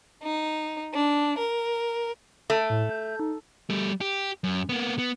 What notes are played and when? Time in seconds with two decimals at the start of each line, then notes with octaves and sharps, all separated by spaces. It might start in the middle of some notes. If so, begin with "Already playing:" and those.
0.22 D#4
0.93 D4
1.37 A#4
2.50 A3 D7
2.70 A2
2.89 G6
3.20 D#4
3.70 G3 A3
4.01 G4
4.44 F#2
4.69 A#3 B3
4.99 B3